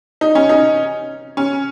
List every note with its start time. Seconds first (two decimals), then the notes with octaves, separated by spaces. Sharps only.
0.21 D#4
0.35 C#4
0.49 D#4
1.37 C#4